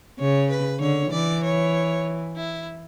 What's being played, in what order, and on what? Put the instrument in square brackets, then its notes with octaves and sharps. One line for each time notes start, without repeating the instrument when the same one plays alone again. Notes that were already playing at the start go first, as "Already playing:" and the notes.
[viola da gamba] C#3 [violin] C#5
[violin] B4
[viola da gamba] D3 [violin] C#5
[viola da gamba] E3 [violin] D5
[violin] C#5
E4